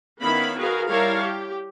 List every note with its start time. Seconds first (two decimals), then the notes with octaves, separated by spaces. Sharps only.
0.21 D#3 B3 C#4 E4 F5 B5
0.60 F#4 G#4 A#4 B4 F5
0.88 G3 E4 A#4 C#5 F5 A5
1.21 G4